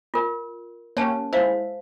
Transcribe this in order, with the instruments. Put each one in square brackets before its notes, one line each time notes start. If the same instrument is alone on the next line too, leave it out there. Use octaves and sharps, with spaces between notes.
[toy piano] F4 A#4
[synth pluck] A#3 C#4 G4 [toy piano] C#5 A5
[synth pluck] G#3 E4 [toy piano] C5 F5